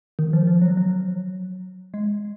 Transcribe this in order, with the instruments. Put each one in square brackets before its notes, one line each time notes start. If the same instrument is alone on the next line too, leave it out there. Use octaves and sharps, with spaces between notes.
[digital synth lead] D#3
F3
F3
F#3
F#3
G#3